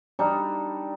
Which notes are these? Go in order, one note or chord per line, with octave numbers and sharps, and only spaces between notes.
G3 D4 D#4 A4